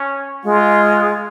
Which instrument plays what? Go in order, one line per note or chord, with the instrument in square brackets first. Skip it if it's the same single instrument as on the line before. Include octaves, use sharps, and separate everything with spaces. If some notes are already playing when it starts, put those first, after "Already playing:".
Already playing: [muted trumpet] C#4
[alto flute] G#3 [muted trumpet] F4